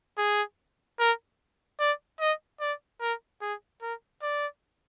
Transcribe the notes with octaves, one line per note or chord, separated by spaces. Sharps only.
G#4
A#4
D5
D#5
D5
A#4
G#4
A#4
D5